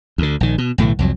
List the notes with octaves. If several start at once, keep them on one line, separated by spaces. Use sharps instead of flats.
D2 D3
A#1 D#3
B2
B1 A2 D3 E3
C2 F2 F#3